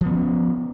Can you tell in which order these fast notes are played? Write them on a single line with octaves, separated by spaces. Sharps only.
F3 B3 C#4